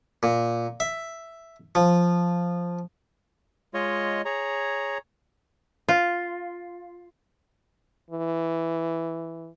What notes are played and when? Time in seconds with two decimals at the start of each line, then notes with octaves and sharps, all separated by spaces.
0.23 A#2
0.80 E5
1.75 F3
3.74 G#3 F4 C#5 D#5
4.25 G#4 C#5 A#5
5.88 F4
8.10 E3